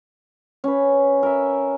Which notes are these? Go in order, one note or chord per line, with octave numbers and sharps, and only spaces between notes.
C#4 B4
A#4 E5